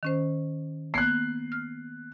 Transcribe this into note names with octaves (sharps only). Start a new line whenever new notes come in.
D#3 C#4 C5
A#3 B3 F#6 G#6 C7
F6